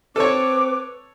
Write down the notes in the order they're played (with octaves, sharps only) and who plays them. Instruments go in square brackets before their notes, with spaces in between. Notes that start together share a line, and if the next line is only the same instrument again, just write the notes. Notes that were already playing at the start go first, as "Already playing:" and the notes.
[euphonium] C4 [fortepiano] A4 C#5 [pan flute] B4 [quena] D6